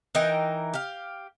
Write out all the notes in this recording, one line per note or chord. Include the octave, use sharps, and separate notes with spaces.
E3 D#4 A#4 G5
G4 F5